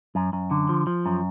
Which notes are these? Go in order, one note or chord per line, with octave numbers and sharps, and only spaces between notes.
F#2
F#2
D3
F3
F3
F#2